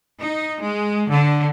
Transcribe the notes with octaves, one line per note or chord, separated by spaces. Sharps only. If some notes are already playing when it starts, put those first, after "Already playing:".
D#4
G#3
D3